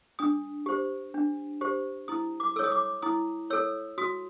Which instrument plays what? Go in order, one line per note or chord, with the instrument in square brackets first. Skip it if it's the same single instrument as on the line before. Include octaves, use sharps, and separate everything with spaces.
[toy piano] D4 D#6
G4 C5
D4
G4 C5
E4 D#6
D6
A4 E6
C#5 D#6
D6
E4 D#6
A4 C#5 E6
F#4 D#6